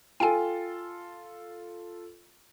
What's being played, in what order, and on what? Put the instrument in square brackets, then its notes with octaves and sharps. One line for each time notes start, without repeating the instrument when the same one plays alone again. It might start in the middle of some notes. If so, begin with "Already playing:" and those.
[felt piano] F4 A4 [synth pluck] G5 G#5